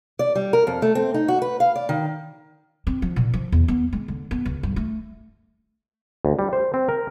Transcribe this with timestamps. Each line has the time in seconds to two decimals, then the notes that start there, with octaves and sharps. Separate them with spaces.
0.19 D5
0.35 G3
0.53 A#4
0.67 F2
0.82 A3
0.95 C4
1.14 D#4
1.28 F#4
1.42 B4
1.60 F5
1.75 D5
1.89 D#3
2.87 C4
3.02 F3
3.16 A#2
3.34 F3
3.52 E2
3.68 B3
3.93 G#3
4.08 D3
4.31 B3
4.46 C#2
4.63 G2
4.76 A3
6.25 D2
6.39 G3
6.53 C5
6.74 C4
6.89 A#4